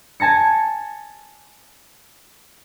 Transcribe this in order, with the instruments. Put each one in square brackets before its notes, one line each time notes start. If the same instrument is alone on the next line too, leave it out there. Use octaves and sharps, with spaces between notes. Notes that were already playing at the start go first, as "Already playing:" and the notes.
[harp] G#5 A5 A#6 C#7